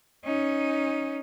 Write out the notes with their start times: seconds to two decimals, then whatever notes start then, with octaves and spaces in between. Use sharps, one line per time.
0.25 C#4 D#4